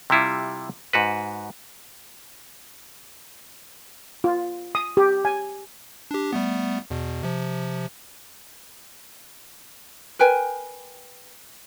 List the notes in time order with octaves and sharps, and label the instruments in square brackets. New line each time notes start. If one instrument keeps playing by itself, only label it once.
[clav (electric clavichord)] C3 G3 E4 F4
G#2 F#4 B4
[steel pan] F4
D#6
G4
G#5
[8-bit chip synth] D4 G4
G3 A3 B3
E2 B2
C3 F3
[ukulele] A#4 B4 G5 G#5